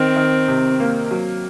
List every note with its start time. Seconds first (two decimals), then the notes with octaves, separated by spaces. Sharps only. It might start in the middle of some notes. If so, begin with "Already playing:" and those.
Already playing: D#3 C4
0.16 D#3
0.48 C3
0.80 A#3
1.11 F#3